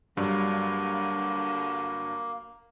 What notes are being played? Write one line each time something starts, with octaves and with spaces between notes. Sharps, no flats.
G2 D3 F#3 G3 A#3